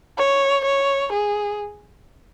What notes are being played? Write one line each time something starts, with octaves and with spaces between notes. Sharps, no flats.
C#5
C#5
G#4